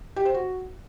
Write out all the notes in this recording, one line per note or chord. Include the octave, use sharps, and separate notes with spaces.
G4
C5
F#4